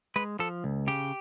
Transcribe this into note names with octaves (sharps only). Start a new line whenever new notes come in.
G#3 B4
F3 A4
C#2
C#3 G4